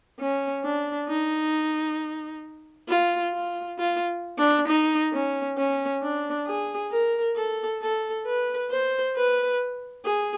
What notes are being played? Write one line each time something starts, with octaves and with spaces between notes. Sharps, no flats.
C#4
D4
D#4
F4
F4
F4
D4
D#4
C#4
C#4
D4
G#4
A#4
A4
A4
B4
C5
B4
G#4